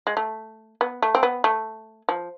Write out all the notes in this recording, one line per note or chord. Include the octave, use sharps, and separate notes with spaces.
G#3
A3
B3
A3
C4
B3
A3
F3